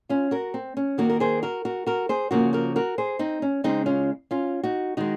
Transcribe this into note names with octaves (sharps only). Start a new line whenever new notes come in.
C#4 F4
F#4 A#4
C4
C#4
D#3 A#3 F#4 A#4
A#4
G#4 C5
F#4 A#4
F#4 A#4
F#4 A#4
G#4 C5
C#3 F3 A#3 F#4 A#4
F#4 A#4
F#4 A#4
G#4 C5
C4 D#4
C#4
C#3 G#3 C4 D#4
C#4 F4
C#4 F4
D#4 F#4
D#3 G#3 D#4 F#4